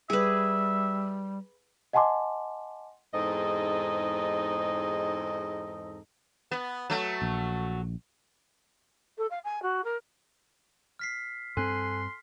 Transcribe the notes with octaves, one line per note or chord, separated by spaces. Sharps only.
G3 G#4 B4 E5
D#5 F#5 G#5 A5 C6 D6
E2 G#2 C4 D#4 A4 D#5
B3
F#3 A3
A#1
A4
F5
G#5
F#4
A#4
F6 B6 C7
G2 C4 A4 G#5 C6 F#6